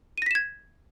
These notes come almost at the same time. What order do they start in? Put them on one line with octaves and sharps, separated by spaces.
D#7 A#6 B6 E7 G#6